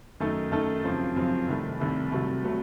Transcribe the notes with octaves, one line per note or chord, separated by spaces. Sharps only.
F#2 D#3 A3 D#4 A4
F#2 D#3 A3 D#4 A4
F#2 C#3 F3 C4
F#2 C#3 F3 C4
C2 C3 D#3 A3
C2 C3 D#3 A3
C2 C3 F#3 A3
C3 F#3 A3